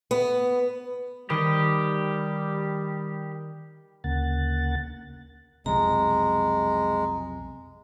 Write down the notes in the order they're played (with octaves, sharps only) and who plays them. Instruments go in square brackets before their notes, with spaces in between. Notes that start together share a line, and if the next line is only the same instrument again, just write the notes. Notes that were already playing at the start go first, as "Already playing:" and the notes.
[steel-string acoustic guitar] B3
[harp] D#3 C5 [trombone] G3 [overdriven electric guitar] G4 [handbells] A#4 B5 D#6
[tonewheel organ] D2 C#3 A#3 F#5 A6
[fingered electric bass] B1 F2 C3 [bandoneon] G#3 [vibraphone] A#5